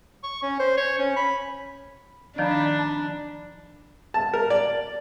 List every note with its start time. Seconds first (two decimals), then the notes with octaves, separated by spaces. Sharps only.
0.23 C#6
0.42 C#4
0.60 C5
0.77 C#5
0.98 C#4
1.16 B5
2.38 D#3 F3 D4 D#4 D5 A5 B5
4.14 A5
4.34 A#4
4.50 D5